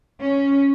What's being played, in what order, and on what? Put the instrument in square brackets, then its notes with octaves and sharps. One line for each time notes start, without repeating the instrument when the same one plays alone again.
[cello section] C#4